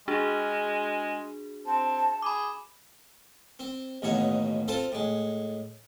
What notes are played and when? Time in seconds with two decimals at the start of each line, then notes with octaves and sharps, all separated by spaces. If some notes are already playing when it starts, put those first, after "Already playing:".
0.08 G#3 D4 F#4 G#4
1.67 C4 A5
2.22 G#4 B5 D6
3.59 C4
4.02 A1 D#2 B2 D#4 C#5
4.68 C4 F4 A4 C5 A5
4.92 A2 G#3